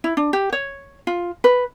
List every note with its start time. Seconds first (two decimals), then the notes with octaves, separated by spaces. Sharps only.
0.04 E4
0.17 D4
0.33 G4
0.52 C#5
1.07 F4
1.44 B4